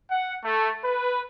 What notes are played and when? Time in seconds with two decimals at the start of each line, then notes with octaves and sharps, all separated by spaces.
0.11 F#5
0.43 A3
0.84 B4